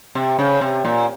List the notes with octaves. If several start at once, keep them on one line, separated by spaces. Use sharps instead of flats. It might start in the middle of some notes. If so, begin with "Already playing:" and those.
C3
C#3
C3
A#2